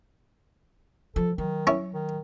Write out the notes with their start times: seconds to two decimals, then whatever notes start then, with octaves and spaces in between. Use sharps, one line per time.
1.16 F3 A4
1.38 D#3 F#3
1.67 C#4 E4 C#6
1.94 D#3